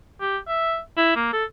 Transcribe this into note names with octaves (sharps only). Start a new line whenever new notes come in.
G4
E5
E4
A#3
A4